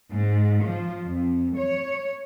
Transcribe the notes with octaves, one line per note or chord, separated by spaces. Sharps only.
G#2
F3
F2
C#5